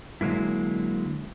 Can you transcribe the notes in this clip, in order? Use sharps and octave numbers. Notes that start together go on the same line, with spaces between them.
D3 F#3 G#3 A#3 E4